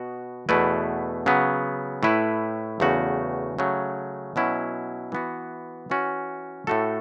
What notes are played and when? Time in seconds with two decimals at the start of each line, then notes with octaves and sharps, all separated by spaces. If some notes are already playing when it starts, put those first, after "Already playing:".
Already playing: B2 B3 F#4
0.49 E2 B2 A3 E4 B4
1.26 C#3 F#3 B3
2.03 A2 A3 E4 B4
2.80 E2 C#3 A3 F#4
3.59 C#3 F#3 A3
4.36 B2 F#3 C#4 E4 B4
5.12 E3 B3 F#4
5.90 E3 C#4 F#4
6.67 A2 A3 F#4 A4